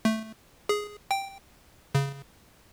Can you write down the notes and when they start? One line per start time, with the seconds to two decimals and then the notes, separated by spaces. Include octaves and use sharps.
0.05 A3
0.69 G#4
1.11 G5
1.95 C#3